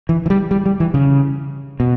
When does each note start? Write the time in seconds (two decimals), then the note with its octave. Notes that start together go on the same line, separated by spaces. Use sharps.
0.09 E3
0.26 E3
0.30 G3
0.51 G3
0.66 G3
0.80 E3
0.94 C#3
1.80 B2